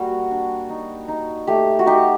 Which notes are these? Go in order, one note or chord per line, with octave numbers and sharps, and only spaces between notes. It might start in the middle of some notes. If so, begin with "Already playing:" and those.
Already playing: G3 A#3 F#4
D4
D#4
D#4
A3 G4
F#4
D#4 G4